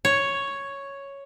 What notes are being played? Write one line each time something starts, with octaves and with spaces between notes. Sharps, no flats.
C#5